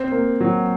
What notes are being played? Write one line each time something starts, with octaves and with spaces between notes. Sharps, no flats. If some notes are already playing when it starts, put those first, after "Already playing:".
Already playing: C4
A#3
F#3